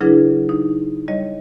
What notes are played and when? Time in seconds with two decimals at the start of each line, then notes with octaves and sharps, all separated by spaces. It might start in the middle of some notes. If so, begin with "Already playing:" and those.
0.01 C#3 F#3 D4 E4 G#4 B4
0.49 D#4
1.08 G3 C#5 D#5